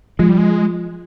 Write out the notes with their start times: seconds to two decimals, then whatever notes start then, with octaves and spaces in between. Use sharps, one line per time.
0.19 F3 G#3
0.29 G3
0.38 G#3